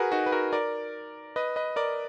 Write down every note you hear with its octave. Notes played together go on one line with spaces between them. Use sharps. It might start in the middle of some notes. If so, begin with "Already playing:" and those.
Already playing: F#4 G#4 A#4 B4
D#4 F#4
B4
F#4 A#4
A#4 D5
B4 D#5
B4 D#5
A#4 D5